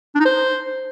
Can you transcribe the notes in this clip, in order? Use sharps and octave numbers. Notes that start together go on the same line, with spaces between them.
D4
D#4
C5